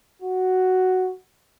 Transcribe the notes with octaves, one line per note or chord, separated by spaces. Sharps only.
F#4